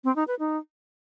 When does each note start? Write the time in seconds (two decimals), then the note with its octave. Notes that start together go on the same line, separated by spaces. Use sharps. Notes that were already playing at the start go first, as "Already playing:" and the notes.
0.04 C4
0.16 D#4
0.28 B4
0.39 D#4